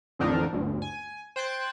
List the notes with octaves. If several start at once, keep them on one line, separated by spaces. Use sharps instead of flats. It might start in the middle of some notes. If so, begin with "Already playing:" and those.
A1 F2 D3 D4 D#4 A#4
G1 D2
G#5
C5 G5 F#6 G#6 A6